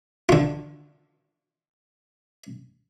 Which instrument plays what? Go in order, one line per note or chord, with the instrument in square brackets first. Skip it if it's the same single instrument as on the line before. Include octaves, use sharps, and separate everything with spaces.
[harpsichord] D3 F4